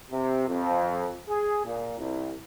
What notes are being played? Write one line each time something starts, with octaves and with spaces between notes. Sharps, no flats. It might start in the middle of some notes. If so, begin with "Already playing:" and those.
C3
F2
G#4
A#2
C2